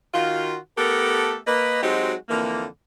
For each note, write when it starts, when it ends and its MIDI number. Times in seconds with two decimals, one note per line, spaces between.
0.13 0.56 51
0.13 0.56 65
0.13 0.56 66
0.78 1.37 57
0.78 1.37 59
0.78 1.37 67
0.78 1.37 69
0.78 1.37 70
1.47 1.81 58
1.47 1.81 71
1.47 1.81 75
1.83 2.13 54
1.83 2.13 56
1.83 2.13 60
1.83 2.13 63
1.83 2.13 66
1.83 2.13 67
2.29 2.64 41
2.29 2.64 50
2.29 2.64 52
2.29 2.64 58